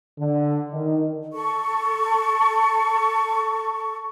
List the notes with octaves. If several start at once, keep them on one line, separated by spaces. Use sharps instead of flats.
D3
D#3
A4 C#6